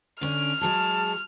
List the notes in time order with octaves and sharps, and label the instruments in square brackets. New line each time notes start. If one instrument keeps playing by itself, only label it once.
[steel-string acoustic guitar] D3 C#4 D4 [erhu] F6
[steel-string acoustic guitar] F#3 G#3 G#4 [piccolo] A5